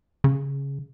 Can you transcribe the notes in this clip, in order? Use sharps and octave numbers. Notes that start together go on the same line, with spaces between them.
C#3